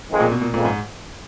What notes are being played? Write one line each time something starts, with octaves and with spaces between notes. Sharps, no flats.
F2 D#3 G#3
A#2
B2
A#2
F2 A#2 C#3 G#3
G#2